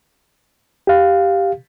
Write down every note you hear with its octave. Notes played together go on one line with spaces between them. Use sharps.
G4 F5